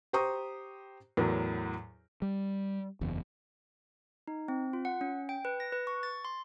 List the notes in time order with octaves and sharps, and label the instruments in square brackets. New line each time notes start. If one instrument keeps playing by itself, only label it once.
[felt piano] G4 C5 A#5 C#6 D#6
E2 A2 F#3 A#4
[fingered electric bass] G3
F#1 E2
[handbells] D#4
C4
F4
F#5
C#4
G5
B4
A#6
B4
C#6
A6
C6